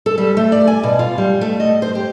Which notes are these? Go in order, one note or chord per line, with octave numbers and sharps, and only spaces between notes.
A4
G3
A3
D5
G#5
B2
F4
G3
A3
D#5
C5
G4